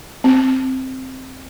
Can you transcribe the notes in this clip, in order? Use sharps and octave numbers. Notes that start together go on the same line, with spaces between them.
C4